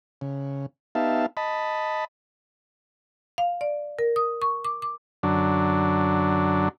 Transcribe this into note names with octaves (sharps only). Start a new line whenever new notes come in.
C#3
B3 D#4 G4 E5 F5 A5
D#5 A5 B5
F5
D5
A#4
D#6
C#6
D6
D6
F#2 D3 F#3 D4